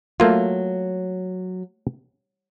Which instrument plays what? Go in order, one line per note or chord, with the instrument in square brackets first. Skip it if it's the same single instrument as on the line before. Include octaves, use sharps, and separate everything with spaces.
[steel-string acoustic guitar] F#3 [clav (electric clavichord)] A3 A#3 F4